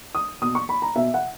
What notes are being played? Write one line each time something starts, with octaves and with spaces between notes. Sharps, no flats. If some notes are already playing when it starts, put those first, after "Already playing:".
D#6
B2 D#6
C#6
B5
A#5
B2 E5
F#5